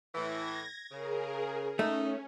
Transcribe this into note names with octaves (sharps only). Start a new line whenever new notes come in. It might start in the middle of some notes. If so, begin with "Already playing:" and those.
A2 E3 G#6 A#6
C#3 G#4 A#4
A3 C#4 D#4